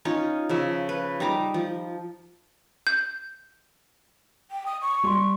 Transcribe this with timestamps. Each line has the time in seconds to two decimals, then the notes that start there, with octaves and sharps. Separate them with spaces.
0.05 C#4 D#4 F4 C#5
0.49 C#3 F3 E5
0.89 B4
1.20 G3 D#4 A#5 D6
1.54 F3
2.87 G6
4.51 G5
4.66 D#6
4.82 C#6
5.03 G3 C6